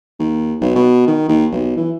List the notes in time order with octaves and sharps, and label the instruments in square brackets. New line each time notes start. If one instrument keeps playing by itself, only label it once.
[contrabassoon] D#2
B1
B2
D#3
D#2
B1
E3